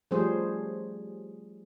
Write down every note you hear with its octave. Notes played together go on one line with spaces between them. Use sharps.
F3 G3 A3 C#4 G#4 C5